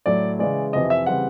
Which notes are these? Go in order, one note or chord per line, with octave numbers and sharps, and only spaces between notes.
A2 F#3 A3 D5
C#3 E3 G#3 D5
F2 C3 E3 D#5
E5
C#3 E3 G3 C4 F#5